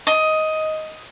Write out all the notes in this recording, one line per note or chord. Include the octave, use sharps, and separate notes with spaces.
D#5